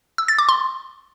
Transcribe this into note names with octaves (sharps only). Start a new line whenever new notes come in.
E6
A6
D6
C6